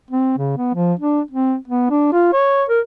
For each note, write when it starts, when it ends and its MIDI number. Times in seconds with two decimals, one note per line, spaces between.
0.11 0.33 60
0.38 0.57 49
0.57 0.72 59
0.74 0.93 53
0.99 1.21 62
1.31 1.55 60
1.68 1.88 59
1.90 2.09 62
2.13 2.29 65
2.33 2.64 73
2.69 2.80 70